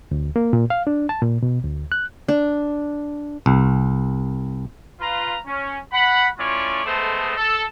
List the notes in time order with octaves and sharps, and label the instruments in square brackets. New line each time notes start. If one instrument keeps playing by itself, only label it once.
[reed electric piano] D2
A#3
A#2
F5
D4
A5
A#2
B2
D2
F#6
[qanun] D4
[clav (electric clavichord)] C2
[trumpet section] F4 B4 A#5
C#4
F#5 B5
A3 C#4 E4 F4 C#5 D5
G#3 A3 B3 A4 C5 D#5
A4